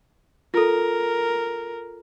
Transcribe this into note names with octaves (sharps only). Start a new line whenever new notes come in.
F4 A4 A#4